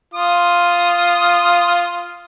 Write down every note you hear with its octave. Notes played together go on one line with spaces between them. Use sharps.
F4 D#6